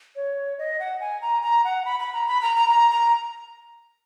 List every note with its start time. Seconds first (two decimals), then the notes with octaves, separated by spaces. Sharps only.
0.16 C#5
0.59 D#5
0.80 F#5
1.01 G#5
1.22 A#5
1.43 A#5
1.64 F#5
1.85 B5
2.00 B5
2.13 A#5
2.28 B5
2.42 A#5
2.56 A#5
2.70 A#5
2.91 A#5